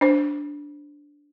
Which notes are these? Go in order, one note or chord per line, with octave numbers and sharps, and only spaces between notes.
D4 C5